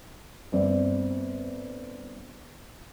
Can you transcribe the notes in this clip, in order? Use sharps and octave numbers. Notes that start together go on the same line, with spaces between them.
G1 C4 D5